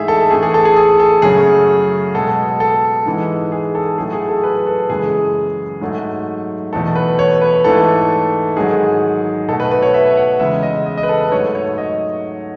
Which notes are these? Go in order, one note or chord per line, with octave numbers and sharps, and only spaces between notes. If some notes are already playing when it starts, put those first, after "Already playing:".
Already playing: G#2 E3 A3 G#4 E5
A4
A2 E3 A3 G#4
G#4
A4
G#4
G#4
A4
F#2 C#3 F#3 A3 G#4
B2 G#3 A4
A4
G#2 E3 G#3
G#4
A4
A2 F#3 A3 G#4
G#4
A4
B4
A4
F#2 C#3 E3 G#3 G#4
G#2 F#3 A3
E2 B2 A3 A4
B4
C#5
B4
G#2 E3 A3 A4
G#2 D#3 F#3 G#4
B2 A3 A4
B4
B4
C#5
E5
F#5
E2 C#3 G#3 E5
D#5
D#5
D#5
B4
A4
B4
G#2 F#3 A3 C#5
C#5
D#5